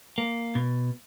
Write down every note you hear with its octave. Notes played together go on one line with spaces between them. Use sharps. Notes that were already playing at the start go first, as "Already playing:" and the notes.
A#3
B2